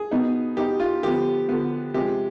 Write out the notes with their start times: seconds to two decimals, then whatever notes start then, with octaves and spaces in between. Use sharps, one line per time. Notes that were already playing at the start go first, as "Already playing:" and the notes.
Already playing: G#4
0.11 B2 B3 D#4
0.57 B2 B3 D#4 G4
0.80 F4
1.03 D3 F3 B3 G4
1.49 D3 F3 B3
1.94 C3 F3 G#3 G4